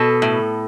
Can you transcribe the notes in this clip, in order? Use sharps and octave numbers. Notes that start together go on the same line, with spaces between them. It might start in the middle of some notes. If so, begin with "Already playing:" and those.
Already playing: B2 A4
A2